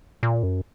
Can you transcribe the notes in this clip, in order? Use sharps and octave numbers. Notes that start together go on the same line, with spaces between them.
A#2
F#2